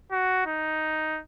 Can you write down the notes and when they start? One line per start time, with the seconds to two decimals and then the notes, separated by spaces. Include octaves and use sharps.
0.12 F#4
0.47 D#4